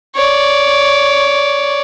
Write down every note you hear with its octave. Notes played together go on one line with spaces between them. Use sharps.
C#5 D5